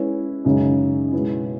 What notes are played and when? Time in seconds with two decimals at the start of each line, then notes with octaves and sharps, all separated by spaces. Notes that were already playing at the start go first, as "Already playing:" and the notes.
Already playing: G#3 C#4 E4 B4
0.45 F#2 C#3 G#3 D#4 G#4
1.12 B2 G#3 B3 E4